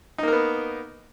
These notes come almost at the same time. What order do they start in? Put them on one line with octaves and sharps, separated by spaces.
D#4 A#3 A#4 B3